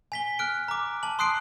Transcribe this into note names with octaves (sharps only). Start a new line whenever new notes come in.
G#5 B6 G7
F6 F#6 D7
A#5 D6
A5 F#7
C6 D#6 F#6 C7 D7